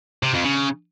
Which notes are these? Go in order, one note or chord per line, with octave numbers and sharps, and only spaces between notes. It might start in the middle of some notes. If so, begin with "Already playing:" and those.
C3
F2
C#3